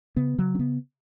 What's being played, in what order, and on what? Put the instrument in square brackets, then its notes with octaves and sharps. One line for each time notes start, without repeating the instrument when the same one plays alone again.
[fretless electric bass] C#3 B3
C#3 F#3
C#4
C#3 B3